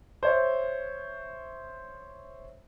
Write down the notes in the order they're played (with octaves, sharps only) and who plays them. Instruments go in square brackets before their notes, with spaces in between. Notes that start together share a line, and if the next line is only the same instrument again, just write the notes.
[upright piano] C5 C#5 E5